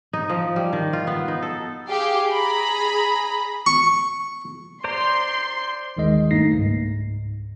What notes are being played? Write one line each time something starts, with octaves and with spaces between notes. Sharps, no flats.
D#4
F3
G3
D#3
F4
B3
D#4
A4
G4 G#4 F5 G5
G#4 A#5 B5
C#6
C5 D5 A#5 C6
G1 D#2 D#3 G#3 D#5
G2 A3 A#3 D#4 A#6 C7
C#2 G#2